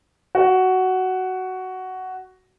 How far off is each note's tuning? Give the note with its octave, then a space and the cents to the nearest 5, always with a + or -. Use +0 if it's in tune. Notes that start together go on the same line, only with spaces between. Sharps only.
F#4 +10